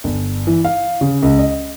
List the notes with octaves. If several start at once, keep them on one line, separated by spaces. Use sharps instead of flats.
G1
E3
F5
C#3
C#2
D#5